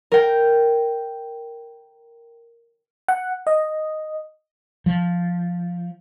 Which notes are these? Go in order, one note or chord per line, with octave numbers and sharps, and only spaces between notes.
A#4 G5
F#5
D#5
F3